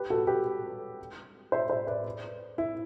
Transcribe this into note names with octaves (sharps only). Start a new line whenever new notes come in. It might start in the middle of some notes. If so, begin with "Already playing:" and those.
Already playing: G4 B4
F#4 A4
G4 B4
C5 E5
C5 E5
B4 D5
E4